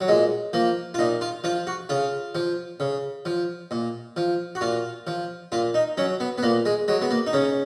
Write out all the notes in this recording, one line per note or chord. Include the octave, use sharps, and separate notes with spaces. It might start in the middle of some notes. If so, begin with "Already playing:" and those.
F#3
A#2 G#3
F3 A#3
F4
A#2 D#4
F4
F3 F4
F#4
C#3 F4
F3
C#3
F3
A#2
F3
F#4
A#2 F4
F3
A#2 F4
D#4
F#3 C#4
B3
B3
A#2 A#3
G#3
F#3 G#3
B3
A#3
D#4
C#3 C#4